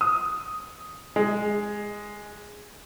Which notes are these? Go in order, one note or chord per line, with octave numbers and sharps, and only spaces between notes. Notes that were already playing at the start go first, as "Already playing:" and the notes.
D#6
G#3